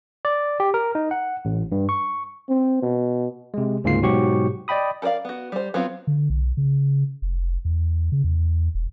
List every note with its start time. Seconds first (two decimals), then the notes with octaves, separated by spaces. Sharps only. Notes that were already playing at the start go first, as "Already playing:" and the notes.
0.25 D5
0.60 G4
0.74 A#4
0.95 D#4
1.11 F#5
1.45 A1
1.72 G2
1.89 C#6
2.49 C4
2.82 B2
3.54 C3 G#3
3.84 D2 G#2 C#3 A#3 F4 C7
4.02 G#2 B2 F#3 F#4 G4 C#6
4.68 D5 D#5 G5 B5 D#6
5.02 A4 A#4 C5 D5 F5
5.25 B3 F#4
5.52 G3 C5
5.74 F#3 B3 C4 F4
6.07 D3
6.30 B1
6.57 C#3
7.22 F1
7.65 E2
8.12 C#3
8.24 E2
8.75 E1